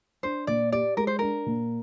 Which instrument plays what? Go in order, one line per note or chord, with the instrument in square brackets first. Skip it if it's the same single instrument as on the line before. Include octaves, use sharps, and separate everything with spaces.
[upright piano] D4 [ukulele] C5
[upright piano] A#2 [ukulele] D5
[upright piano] G4 [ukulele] D5
[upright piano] G#3 [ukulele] A#4
[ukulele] C5
[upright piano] D4 [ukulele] A#4
[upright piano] A#2